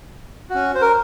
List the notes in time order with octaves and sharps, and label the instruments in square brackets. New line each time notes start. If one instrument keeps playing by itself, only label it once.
[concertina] C#4 F#4
C5
A#4